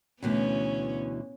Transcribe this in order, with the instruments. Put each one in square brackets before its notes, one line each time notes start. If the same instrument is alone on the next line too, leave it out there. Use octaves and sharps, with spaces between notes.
[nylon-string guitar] D2 B2 E3 [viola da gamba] B3 C#4